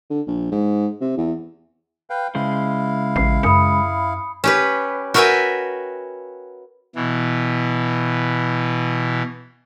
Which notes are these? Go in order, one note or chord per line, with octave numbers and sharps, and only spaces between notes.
D3
A#1
G#2
C3
E2
B4 F5 G5
C#3 G#3 E4 C5 F5
A1 C7
F#2 B5 D#6 C#7
C#4 G4 B4
F#4 A#4 B4 E5 G5 G#5
B2 E3